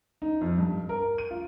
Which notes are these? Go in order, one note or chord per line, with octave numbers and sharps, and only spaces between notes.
D#4
F2
G2
A#4
D#7
F4